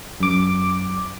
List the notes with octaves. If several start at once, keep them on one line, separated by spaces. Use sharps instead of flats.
F#2 D6